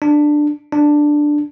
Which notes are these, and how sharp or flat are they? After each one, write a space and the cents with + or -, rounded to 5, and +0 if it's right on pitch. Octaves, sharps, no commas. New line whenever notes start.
D4 +10
D4 +5